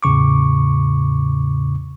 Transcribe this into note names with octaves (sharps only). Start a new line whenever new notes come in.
E2 A2 C#3 C#6 D6